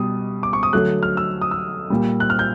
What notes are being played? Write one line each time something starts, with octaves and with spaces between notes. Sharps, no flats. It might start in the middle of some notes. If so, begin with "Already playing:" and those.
Already playing: B2 G3 D#6
D6
C#6
D#6
D3 F#3 A3 F#6
F6
E6
D#6
E6
A#2 G3
F#6
F6
G6